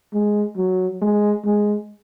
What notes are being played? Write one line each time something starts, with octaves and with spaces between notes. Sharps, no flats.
G#3
F#3
G#3
G#3